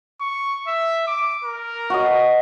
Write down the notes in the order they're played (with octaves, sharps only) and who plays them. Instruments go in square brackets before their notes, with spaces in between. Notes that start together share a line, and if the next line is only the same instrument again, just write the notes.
[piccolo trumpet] C#6
E5
D6
A#4
[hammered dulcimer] F#4 D#5